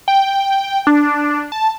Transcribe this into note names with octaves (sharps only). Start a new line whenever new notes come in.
G5
D4
A5